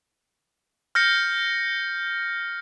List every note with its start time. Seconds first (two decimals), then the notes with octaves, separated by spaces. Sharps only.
0.95 F6 G6 A#6 C#7